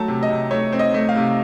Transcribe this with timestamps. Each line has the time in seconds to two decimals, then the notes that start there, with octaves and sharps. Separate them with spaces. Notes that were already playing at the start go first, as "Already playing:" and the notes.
Already playing: F#3 A3 A5 A#5
0.08 C3
0.23 D#5
0.29 C3
0.51 A3 C#5
0.73 C4
0.79 D#5
0.94 A3
1.09 F5
1.16 C3